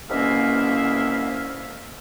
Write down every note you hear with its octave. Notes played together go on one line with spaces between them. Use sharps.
C2 B2 A#3 C#4 E5 F5